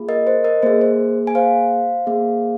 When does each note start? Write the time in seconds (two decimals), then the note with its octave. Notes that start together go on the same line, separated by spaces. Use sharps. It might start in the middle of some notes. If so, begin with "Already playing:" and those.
Already playing: A#3 F4 G#4
0.09 A#4 D#5
0.27 C5
0.44 A#4 D#5
0.62 A#3 G#4 C5
0.81 C5
1.27 G#5
1.35 C5 F5
2.07 A#3 G#4